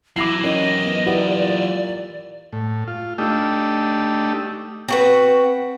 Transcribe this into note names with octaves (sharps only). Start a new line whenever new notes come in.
E3 F#3 E4 D6 A#6 C7
D#3 C#4 D#5
B3
B3 E4 G4 D5
A#2
A2
F4
A3 D4 D#4 G4 E6
C4 F#4 B4